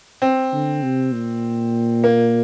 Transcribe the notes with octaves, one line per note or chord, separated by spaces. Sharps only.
C4
D3
C3
A#2
A#3